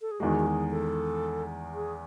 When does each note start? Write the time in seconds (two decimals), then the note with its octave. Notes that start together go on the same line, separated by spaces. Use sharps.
0.01 A4
0.11 G#4
0.20 E2 D#3 G#3 F#4
0.39 F#4
0.46 G#4
0.71 A4
1.75 G#4